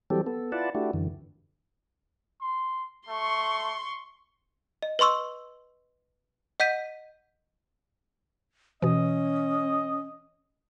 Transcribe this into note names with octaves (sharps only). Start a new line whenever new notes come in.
E3 F#3 G3 C4 G4 A4
B3 A4
E4 F4 B4 D5 F#5 A5
A3 D4 E4 F#4 G4
F#2 D3 E3
C6
A3 C6 C#6
D#5
B4 D#5 C6 C#6 E6
D#5 F#5 G6 B6 D#7
B2 E3 C#4 D#5